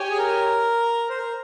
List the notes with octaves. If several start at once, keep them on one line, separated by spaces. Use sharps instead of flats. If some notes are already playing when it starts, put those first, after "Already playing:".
Already playing: G4 C#5 G#5
G#4
A#4
C5
A#4